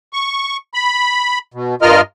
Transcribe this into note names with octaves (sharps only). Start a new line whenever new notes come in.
C#6
B5
B2
G2 F4 A#4 D#5 F6